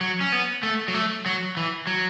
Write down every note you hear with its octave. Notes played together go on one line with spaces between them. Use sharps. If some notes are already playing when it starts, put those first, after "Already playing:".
F#3
C#4
B3
A3
F#3
A3
F#3
E3
F#3